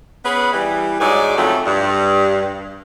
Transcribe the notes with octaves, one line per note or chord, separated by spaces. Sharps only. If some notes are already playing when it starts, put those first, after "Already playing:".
B3 C#4 G#4 B4
E3 G3
G#2 F#3 D#4 G#4 D5
F2 C#3 F#3 A3
G2